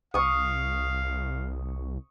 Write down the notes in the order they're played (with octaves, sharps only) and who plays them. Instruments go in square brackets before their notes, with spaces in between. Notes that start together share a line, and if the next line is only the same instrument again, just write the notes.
[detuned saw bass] C2 [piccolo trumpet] F5 [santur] C#6 D#6